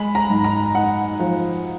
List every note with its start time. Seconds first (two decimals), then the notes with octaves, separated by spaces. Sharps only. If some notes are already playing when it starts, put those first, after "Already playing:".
Already playing: G#3 B5
0.15 A#5
0.30 G#2
0.44 A#5
0.75 D#4 F#5
1.20 F3